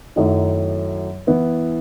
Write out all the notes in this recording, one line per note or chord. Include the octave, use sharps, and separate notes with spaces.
F#2 D#3 F#3 A3 E4
E3 B3 E4